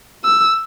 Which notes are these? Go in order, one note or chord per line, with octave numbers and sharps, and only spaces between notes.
E6